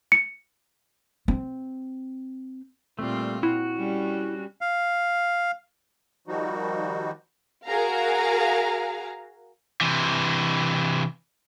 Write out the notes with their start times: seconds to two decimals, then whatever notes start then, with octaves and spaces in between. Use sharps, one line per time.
0.12 C#7
1.28 C4
2.99 A#2 G3 A3 C4 F4
3.43 E4 F#4
3.76 G3 C#4
4.61 F5
6.28 D#3 F3 G3 D#4 F#4
7.66 F#4 G#4 A#4 F5 A#5
9.81 C3 E3